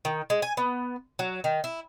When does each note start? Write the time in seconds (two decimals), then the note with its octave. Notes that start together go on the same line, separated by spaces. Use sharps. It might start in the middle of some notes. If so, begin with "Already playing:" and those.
0.05 D#3
0.30 G#3
0.42 G#5
0.57 B3
1.19 F#3
1.44 D#3
1.64 E4